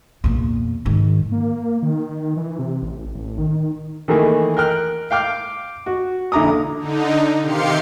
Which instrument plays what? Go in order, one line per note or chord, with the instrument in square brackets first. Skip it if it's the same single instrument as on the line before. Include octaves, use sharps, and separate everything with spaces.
[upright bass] E2 A#2
G#2 D#3
[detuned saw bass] A#3
D#3
E3
C3
A1
A1
D#3
[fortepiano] D#3 E3 A3 A#3 G#4
A#4 G5 F6 F#6
F5 G5 D6 F6
F#4
A#1 D3 E4 A#5 D6 D#6
[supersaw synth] D3 D#4
C3 D#3 G4 F5 C6 C#7